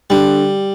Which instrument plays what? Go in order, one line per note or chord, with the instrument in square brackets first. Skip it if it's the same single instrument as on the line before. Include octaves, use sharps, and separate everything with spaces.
[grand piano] D3 [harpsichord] G3